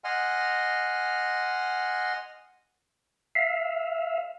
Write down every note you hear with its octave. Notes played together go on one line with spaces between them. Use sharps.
D#5 F#5 G#5 C6 F6
E5 F5